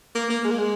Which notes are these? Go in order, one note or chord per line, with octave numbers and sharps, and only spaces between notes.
A#3
A#3
G#3
A#3
G#3